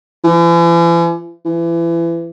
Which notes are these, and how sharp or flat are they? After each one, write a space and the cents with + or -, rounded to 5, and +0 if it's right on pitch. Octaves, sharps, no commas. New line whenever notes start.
E3 +45
E3 +30